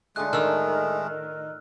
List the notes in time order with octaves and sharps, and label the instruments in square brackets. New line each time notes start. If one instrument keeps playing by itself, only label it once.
[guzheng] D3 D#4 F4 [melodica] G#3 A3 [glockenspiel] F#6
[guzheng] A2 D4 D#4 [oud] D#3 [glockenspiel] E6 F6